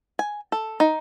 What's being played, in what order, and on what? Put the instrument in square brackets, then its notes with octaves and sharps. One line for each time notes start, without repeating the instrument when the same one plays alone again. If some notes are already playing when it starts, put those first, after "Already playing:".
[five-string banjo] G#5
A4
D#4